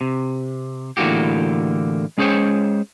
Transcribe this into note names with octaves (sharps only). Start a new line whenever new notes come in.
C3
A2 D3 E3 A#3 F#4 G4
G#3 C#4 G#4 C5 C#5 G5